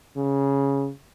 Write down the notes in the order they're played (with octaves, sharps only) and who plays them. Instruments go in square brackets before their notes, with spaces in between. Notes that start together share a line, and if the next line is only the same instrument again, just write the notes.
[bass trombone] C#3